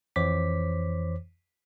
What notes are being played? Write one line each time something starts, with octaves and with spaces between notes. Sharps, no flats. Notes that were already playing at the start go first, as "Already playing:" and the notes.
F2 E3 C5 C#5 D6 B6